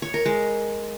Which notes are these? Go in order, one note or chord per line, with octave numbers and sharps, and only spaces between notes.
C#5
A#4
G#3